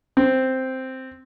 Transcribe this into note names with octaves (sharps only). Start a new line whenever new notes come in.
C4